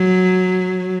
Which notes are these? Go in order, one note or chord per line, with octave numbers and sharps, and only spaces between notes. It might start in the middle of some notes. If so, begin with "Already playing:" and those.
Already playing: F#3